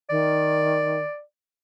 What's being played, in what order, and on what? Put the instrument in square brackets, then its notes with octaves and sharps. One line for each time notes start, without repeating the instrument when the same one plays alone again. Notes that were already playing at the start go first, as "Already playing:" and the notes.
[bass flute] D#3 [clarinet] D5